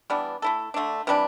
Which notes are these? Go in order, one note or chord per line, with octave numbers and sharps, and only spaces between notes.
E3 G3 B3 D4
A3 E4 A4
D3 A3 D4
C3 E3 G3 D4